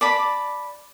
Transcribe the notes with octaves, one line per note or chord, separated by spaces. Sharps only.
D5 A5 B5